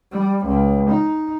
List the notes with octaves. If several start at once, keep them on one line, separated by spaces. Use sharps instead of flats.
G3
C#2
D#4